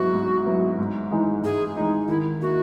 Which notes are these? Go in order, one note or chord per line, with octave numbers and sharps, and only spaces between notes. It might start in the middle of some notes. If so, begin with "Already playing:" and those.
Already playing: G#2 F#3 B3 E4 F#4
G#2
F#3 B3 E4
G#2
E3 G#3 D#4
G#2 G#4
E3 G#3 D#4
D#3 E4
A#3 E4 F#4